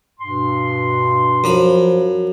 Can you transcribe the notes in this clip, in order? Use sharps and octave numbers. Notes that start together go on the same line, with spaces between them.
G2 B2 C6
F#2 F3 B5